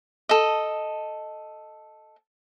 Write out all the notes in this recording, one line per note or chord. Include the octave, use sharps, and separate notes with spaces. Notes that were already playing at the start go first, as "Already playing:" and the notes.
A4 D#5